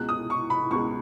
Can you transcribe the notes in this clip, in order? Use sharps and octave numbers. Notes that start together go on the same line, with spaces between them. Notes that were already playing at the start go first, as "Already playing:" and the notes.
Already playing: C#2 B2 G#3 F#6
D#6
C#6
B5
C#2 B2 G#3 C#6